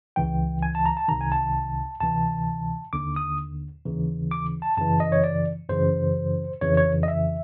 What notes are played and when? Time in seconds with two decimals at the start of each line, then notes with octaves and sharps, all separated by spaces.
0.16 C#2 C#3 E3 G5
0.63 G#5
0.75 A5
0.86 A#5
0.97 A5
1.08 C2 C3 D#3 A#5
1.21 G#5
1.32 A5
2.00 D2 C3 E3 A5
2.93 D#2 D3 D6
3.16 D#6
3.85 D#2 C#3 E3
4.31 D6
4.62 A5
4.77 F#2 C#3 E3 A5
5.00 D#5
5.12 C#5
5.24 D5
5.69 F#2 C#3 E3 C5
6.61 F2 C#3 E3 C#5
6.77 C#5
7.03 D#5
7.08 E5